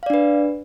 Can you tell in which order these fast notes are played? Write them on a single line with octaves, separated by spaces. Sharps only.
F5 D5 D4 B4